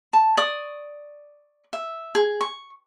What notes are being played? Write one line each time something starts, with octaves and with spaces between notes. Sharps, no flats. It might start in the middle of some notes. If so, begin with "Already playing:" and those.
A5
D5 C#6 D#6
E5
G#4
C#6